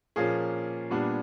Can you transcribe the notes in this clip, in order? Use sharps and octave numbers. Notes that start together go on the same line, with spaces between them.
A#2 F3 A#3 C#4 G#4
A#2 G3 B3 D4